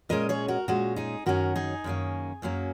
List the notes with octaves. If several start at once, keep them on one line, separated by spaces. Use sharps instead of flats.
A#2 G#3 C#4 A#4 D#5
G#4 C#5
F#4 A#4
A#2 G#3 C#4 F#4
D#4 G#4
F#2 D#3 A#3 C#4 F#4 A#4
D#4 G#4
F#2 D#3 A#3 C#4
F#2 F#3 A#3 C#4